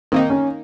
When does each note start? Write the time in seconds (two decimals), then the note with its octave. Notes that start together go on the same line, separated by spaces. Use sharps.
0.12 D#3 A#3 C4 D#4
0.30 C#4